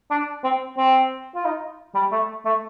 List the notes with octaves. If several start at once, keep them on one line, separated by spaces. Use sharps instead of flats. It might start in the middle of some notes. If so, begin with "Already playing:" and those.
D4
C4
C4
F4
D#4
G3
A3
A3